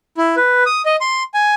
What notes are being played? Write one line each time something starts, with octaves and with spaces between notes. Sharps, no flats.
E4
B4
D#6
D#5
C6
G#5